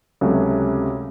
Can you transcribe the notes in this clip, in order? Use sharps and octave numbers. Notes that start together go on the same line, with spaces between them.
C#2 C3 F#3 A3 C#4